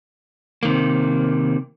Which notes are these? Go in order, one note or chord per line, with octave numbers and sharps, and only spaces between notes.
C3 D#3 A#3